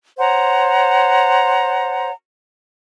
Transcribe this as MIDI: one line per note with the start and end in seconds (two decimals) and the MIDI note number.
0.18 2.10 72
0.18 2.10 73
0.18 2.10 78
0.18 2.10 82